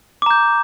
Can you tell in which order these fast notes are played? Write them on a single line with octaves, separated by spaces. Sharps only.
D6 A#5 G6